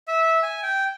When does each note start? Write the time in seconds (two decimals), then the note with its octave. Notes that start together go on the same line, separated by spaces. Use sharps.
0.08 E5
0.43 G#5
0.63 G5